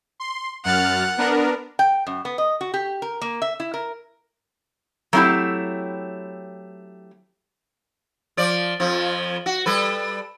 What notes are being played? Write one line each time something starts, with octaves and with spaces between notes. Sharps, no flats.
C6
F#2 F#5 F6 A6
B3 D4 A#4
G5
F#2
B3
D#5
F#4
G4
A#4
A#3
E5
E4
A#4
F#3 A3 C4 D#4 E4 G4
F3 D5
F2 F3
F#4
G3 A4 B4